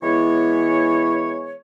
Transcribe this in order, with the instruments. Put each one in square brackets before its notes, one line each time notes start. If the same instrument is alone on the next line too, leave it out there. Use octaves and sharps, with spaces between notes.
[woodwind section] E3 G#3 B3 E4 C#5